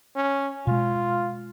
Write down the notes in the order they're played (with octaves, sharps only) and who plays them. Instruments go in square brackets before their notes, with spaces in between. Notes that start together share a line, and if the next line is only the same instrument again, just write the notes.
[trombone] C#4
[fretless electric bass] B2 G#3 [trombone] F4